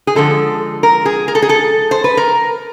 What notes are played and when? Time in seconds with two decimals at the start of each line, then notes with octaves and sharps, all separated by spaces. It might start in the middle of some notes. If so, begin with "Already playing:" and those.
0.07 G#4
0.15 D3 F3 G#3 A4
0.83 A#4
1.05 G#4
1.28 A#4
1.35 A4
1.42 G#4
1.49 A4
1.91 C5
2.04 B4
2.17 A#4